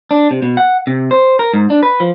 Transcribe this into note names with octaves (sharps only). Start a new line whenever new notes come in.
D4
C3
B2
F#5
C3
C5
A#4
G#2
D4
B4
F3